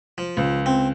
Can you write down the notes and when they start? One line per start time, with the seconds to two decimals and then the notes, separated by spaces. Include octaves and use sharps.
0.18 F3
0.37 C#2
0.66 C4